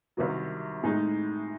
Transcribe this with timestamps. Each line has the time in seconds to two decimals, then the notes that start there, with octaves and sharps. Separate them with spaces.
0.17 C2 C3 D#3 F#3
0.83 A2 G#3 D#4